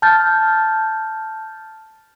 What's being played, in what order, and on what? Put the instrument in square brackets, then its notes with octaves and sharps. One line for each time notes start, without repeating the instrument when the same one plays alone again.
[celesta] A5 F6 G6 A6